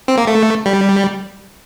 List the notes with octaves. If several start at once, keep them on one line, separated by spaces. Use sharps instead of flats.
C4
A#3
A3
G3